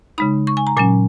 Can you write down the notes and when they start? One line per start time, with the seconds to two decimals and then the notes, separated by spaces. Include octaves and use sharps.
0.18 C#3 G#3 D#4 B5
0.47 C#6
0.57 G#5
0.67 A#5
0.77 A#2 F#3 C#4 G#5